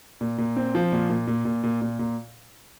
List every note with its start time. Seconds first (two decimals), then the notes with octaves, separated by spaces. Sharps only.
0.21 A#2
0.38 A#2
0.57 C4
0.75 F3
0.92 A#2
1.10 A#2
1.27 A#2
1.45 A#2
1.64 A#2
1.82 A#2
1.99 A#2